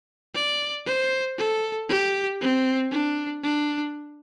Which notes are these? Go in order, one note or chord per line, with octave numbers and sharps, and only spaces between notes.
D5
C5
A4
G4
C4
D4
D4